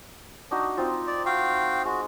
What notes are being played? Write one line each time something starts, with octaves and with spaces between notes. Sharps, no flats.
D4 D#4 F#4
C4 D#4 F4
D5
F#4 F5 G5
G#3 F#4